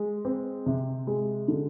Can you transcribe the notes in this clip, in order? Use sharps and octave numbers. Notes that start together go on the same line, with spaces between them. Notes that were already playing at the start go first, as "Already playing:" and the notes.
Already playing: G#3
C4
C3
G#3
D3